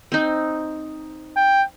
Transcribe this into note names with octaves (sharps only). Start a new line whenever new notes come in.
C4 D#4
G5